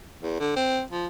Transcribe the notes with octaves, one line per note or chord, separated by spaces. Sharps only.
E2
D3
C4
F3